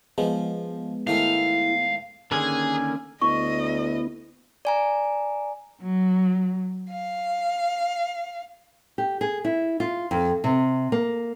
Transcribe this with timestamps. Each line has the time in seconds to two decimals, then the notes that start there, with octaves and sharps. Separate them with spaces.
0.18 F3 G#3 B3
1.07 G#2 D#3 A3 E4 F5
2.32 D3 D#3 A#3 C#4 G#4 A#4 G#5
3.21 D2 B3 E4 D#5 C#6
4.65 D5 G#5 A#5
5.81 F#3
6.89 F5
8.98 G4
9.21 G#4
9.45 E4
9.80 F4
10.11 F2
10.44 C3
10.92 A#3